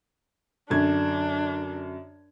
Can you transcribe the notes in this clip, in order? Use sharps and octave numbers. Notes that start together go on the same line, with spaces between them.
F#2 D3 D4 G#6